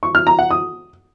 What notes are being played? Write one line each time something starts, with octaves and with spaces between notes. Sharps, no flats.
C#6
F6
A#5
F#5
D#6